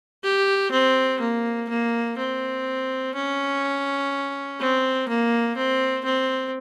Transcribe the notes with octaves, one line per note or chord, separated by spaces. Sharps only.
G4
C4
A#3
A#3
C4
C#4
C4
A#3
C4
C4